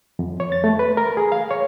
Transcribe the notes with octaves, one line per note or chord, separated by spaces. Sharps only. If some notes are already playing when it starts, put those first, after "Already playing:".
F2
C#5
A6
A3
B4
A#4
G#4
F5
C#5